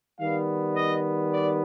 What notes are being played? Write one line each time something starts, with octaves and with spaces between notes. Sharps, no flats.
D#3 G3 B3 F5
D#5
D5